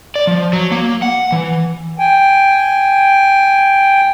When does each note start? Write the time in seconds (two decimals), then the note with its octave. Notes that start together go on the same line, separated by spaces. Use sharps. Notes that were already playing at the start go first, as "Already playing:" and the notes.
0.16 D5
0.27 F3
0.53 F#3
0.72 A#3
1.02 F#5
1.32 E3
1.99 G5 G#5